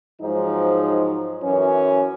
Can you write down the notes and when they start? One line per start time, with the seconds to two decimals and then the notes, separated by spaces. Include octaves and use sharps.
0.22 G#2 F3 F#3 D#4
1.42 F#2 E3 F#3 C#4 C#5